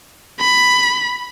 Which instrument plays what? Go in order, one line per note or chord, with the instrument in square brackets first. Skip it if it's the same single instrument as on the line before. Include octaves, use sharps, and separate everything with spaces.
[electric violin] B5